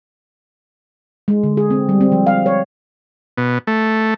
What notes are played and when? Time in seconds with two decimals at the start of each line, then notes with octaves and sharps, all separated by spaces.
1.28 G#3
1.44 D3
1.57 G#4
1.71 C4
1.89 G3
2.01 C4
2.12 F3
2.27 F5
2.46 C#5
3.38 B2
3.67 A3